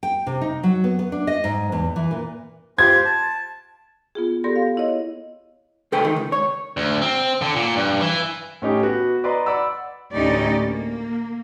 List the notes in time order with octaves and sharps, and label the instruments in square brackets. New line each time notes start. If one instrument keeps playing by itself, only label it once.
[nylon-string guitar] G5
C3
D#4
F#3
B3
B3
D4
D#5
G#2
E2
E3
A#2
[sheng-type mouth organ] F4 G4 C5 [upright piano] G#6
[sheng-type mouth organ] A5
[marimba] B3 F4 G#4
B3 G4 A4 D5 C6 A#6
F5
E4 C#5 D#5
[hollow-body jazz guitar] C2 G#4 A4 B4 G5
D#3
C#2
C#5
[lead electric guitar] D2
C4
D3
A#2
G2
E3
[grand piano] A2 C#4 D#4 G4
B3 F#4
B4 D5 D#5 A#5 C6
D5 F#5 B5 E6
[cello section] D2 A2 C#4 D#4 G4 D5
A#3